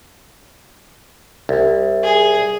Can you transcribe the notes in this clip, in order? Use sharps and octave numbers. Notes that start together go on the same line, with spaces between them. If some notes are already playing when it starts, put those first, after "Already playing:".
C2
G#4